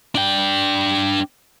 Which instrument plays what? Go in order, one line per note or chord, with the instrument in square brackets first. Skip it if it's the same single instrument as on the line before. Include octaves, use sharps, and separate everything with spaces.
[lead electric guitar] D4 G5